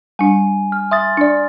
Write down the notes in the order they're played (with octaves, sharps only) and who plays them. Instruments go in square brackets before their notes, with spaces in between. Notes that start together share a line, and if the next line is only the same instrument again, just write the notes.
[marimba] G3 D4 [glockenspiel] G#5
[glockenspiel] F6
[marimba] E5 [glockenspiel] C6 D#6 A6
[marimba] D4 D5